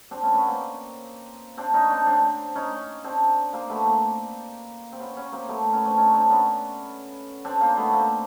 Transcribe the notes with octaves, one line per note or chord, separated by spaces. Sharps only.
C4 D4
B3 C#4
B3 C#4
A#3 C4
C4 D4
C#4 D#4
C4 D4
C4 D4
C#4 D#4
C4 D4
A#3 C4
A3 B3
A#3 C4
C4
B3 C#4
B3 C#4
A#3 C4
A3 B3
B3 C#4
C4 D4
C#4 D#4
C4 D4
B3 C#4
C4 D4
A#3 C4
A3 B3
A#3 C4